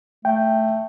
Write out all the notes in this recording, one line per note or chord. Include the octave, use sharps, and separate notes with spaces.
A3 G5